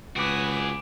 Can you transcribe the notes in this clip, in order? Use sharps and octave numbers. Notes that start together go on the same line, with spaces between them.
C#2 F#4 G#4 B4 D6 D7